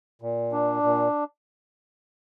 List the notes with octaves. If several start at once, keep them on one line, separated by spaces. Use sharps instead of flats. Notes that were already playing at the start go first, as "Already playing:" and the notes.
A#2
D4
A#2